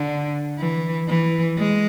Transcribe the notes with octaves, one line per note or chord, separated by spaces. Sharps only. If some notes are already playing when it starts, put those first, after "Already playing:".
Already playing: D3
E3
E3
G#3